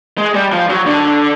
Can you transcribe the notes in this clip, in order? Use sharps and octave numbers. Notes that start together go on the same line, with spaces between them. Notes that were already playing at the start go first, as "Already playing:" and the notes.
G#3
G3
F3
F#3
D3